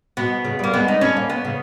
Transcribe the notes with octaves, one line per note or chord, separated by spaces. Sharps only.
B2 B3
C#3
G3 A#3
G#3 B3
D#4
B3 C#4
A#3
B3
C#3